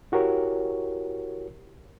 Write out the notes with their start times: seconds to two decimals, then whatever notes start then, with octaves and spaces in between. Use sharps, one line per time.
0.12 E4 F#4 G4 A#4 C#5